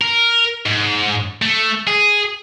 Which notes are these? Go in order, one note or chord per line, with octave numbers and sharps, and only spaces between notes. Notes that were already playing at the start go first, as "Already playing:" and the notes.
A#4
G#2
A3
G#4